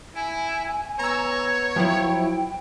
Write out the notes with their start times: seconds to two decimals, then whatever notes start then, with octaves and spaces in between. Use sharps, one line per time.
0.15 E4 G#5
0.99 B3 C#5 A#5 E6
1.76 F3 F#3 E4 G5